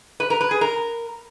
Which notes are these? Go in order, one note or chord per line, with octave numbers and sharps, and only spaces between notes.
B4
A#4
B4
G#4
A#4